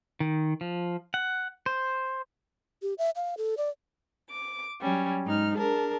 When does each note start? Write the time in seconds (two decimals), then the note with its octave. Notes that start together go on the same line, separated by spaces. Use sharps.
0.20 D#3
0.61 F3
1.14 F#5
1.66 C5
2.82 G4
2.98 E5
3.16 F5
3.38 A4
3.57 D5
4.29 D6
4.81 F#3 G3 C#4
5.24 G#2 D#4 F6
5.57 D4 G#4 A#4 A5